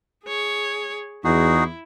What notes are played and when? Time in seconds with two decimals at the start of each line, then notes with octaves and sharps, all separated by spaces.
0.24 G#4 C#5
1.24 E2 D#4 E4 F#4 G#4